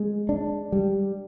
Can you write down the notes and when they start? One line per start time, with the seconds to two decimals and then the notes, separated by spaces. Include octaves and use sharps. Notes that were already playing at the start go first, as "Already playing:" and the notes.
Already playing: G#3
0.29 D4
0.72 G3